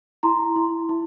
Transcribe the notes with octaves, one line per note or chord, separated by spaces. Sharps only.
E4 A#5 C6
E4
E4